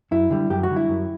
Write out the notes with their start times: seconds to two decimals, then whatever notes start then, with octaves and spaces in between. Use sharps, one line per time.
0.11 F#2 E4
0.30 D3 G3
0.50 F#2 G4
0.63 F#4
0.69 D3 G3
0.76 E4
0.89 F#2